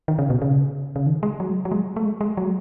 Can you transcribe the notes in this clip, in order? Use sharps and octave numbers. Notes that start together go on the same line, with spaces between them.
D#3
C#3
B2
C#3
C#3
D#3
G#3
F#3
F#3
G#3
A3
G#3
G#3
F#3